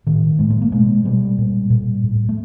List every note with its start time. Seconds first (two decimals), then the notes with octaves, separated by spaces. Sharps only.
0.07 A2 D#3
0.39 A2 G#3
0.50 A3
0.62 A#3
0.72 B2 G#3
1.05 B2 G3
1.38 A#2
1.70 A#2
2.04 A2
2.29 A3